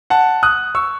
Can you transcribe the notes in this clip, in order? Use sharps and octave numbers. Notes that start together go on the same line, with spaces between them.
F#5 A5
D#6 F#6
C#6 E6